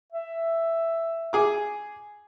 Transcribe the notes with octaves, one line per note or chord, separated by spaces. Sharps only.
E5
G#4 D6